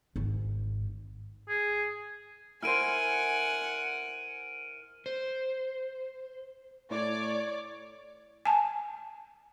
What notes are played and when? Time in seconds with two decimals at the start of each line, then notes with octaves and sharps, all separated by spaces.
0.16 G#1 G#2
1.49 G#4
2.63 E4 A#4 C5 F#5 G#5 F6 D7 D#7
5.06 C5
6.91 A2 C#5 D5 D6
8.45 G#5 A5